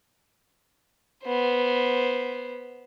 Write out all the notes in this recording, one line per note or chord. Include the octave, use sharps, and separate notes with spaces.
B3 C5